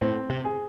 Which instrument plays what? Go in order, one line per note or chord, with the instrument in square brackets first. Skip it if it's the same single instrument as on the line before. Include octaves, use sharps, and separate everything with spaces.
[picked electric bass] A2 [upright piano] C4
[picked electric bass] C3
[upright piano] G#4